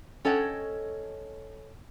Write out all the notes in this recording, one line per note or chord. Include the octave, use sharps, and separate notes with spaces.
C#4 A4 C#5 D#5 F#5 G5